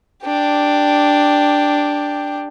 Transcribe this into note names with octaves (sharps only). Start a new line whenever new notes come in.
D4 G4